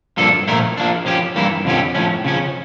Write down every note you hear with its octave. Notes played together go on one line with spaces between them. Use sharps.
G2 F3 A#3 D4 A4
A#2 F3 A3 E4 A#4
F3 A#3 D4
F3 C#4 G4
G2 E3 A#3 E4
F2 D3 F3 C#4 G4
A2 F3 C#4
C#3 F3 C#4